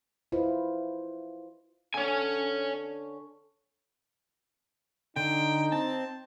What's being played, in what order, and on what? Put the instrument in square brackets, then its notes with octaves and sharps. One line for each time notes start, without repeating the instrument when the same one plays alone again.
[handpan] E4 F4 B4 C5 D#5
[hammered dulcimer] D3 C#4 [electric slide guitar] C#5 G#5
[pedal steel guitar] D3 [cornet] D#4 [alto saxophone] G5
[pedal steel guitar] C4 [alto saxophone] A5